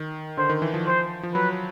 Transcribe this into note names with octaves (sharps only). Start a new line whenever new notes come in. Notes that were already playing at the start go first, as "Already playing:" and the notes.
Already playing: D#3
D3 C5
D#3
E3
F3
C5
F3
F#3 B4